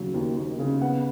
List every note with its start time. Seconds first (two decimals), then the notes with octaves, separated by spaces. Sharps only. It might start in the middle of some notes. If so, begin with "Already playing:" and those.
Already playing: D#2 C#3 F#3
0.14 D#2
0.36 D#2
0.59 C#3
0.81 B3 F#5